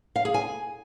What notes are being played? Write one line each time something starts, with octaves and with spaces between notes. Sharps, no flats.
F5
G#4
G#5